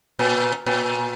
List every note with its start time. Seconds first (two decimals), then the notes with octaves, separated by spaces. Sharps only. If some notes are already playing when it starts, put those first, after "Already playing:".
0.19 A#2
0.66 A#2